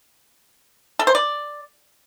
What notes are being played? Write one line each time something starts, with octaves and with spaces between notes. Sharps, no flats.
A4
C5
D5